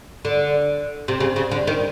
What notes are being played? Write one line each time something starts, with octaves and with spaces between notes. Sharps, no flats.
D3
C3
C#3
C#3
D3
D#3